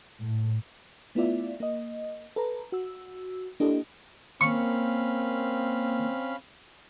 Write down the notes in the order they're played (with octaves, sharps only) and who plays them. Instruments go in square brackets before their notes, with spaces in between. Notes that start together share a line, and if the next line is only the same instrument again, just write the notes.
[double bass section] A2
[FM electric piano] A3 B3 E4 F4 D5 E5
A#3 D#5
A4 B4 A#5
F#4 E6
A#3 D4 E4 G4 A4 D#5
[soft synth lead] A#3 [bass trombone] C4 [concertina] C#4 F5 B5 [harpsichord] C#6